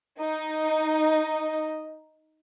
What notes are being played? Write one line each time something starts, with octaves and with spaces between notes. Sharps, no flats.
D#4 D#5